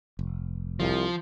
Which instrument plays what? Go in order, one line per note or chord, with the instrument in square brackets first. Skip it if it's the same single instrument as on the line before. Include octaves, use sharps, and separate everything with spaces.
[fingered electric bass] F1
[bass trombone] C2 [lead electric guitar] F3